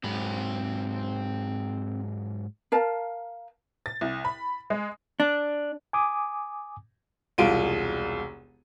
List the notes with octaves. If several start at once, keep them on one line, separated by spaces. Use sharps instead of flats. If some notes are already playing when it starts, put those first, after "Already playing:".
G#2 F#3 C4 B5
A#4 F5 A5
A6
C2
B5
G#3
D4
G#5 D6 D#6
E1 C2 F4 D7 D#7